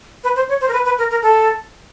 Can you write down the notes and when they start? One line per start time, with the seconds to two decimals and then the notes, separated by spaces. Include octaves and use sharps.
0.24 B4
0.36 C5
0.49 C#5
0.61 C5
0.69 A#4
0.73 B4
0.85 B4
0.98 A#4
1.11 A#4
1.22 A4